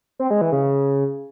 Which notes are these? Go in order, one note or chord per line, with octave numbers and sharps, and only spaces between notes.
C4
G#3
E3
C#3